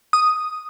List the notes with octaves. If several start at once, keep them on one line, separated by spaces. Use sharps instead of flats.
D#6